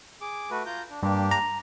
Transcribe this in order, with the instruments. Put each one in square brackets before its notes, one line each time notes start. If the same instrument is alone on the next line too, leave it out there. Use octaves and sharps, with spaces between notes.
[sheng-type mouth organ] G#4 D6
A3 F#4 B4
F4 A#5 G6
D4
[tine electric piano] G2 [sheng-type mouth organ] A#3 D4 G4
[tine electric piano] A#5